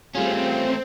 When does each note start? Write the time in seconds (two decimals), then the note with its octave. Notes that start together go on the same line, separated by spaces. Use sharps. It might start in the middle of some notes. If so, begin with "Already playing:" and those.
0.15 G3 A3 C4 C#4 F4 G#4